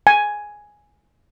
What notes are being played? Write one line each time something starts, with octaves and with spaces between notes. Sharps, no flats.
G#5